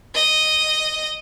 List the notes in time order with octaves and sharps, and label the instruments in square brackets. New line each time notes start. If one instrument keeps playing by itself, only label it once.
[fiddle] D#5